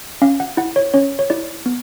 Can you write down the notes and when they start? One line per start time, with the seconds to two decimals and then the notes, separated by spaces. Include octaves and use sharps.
0.22 C#4 F5
0.40 F#5
0.57 E4 F#5
0.76 C#5
0.94 C#4 C#5
1.19 C#5
1.30 E4 D5
1.66 B3